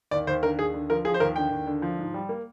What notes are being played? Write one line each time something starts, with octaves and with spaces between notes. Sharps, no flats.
D#2 D5
D#2 C5
D3 A#4
D#2 G#4
D3
F3 A#4
F3 G#4
C5
D#2 A#4
D3 G5
D#2
D3
F3
G#2
G3
A#3